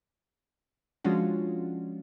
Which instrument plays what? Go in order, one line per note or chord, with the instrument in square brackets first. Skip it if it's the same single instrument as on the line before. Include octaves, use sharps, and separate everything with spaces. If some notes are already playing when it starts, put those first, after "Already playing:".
[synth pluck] F3 G#3 C#4 D4 F4 F#4